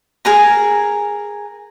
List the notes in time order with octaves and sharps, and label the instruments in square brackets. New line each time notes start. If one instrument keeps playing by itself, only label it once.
[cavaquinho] G#4 A#4 A#5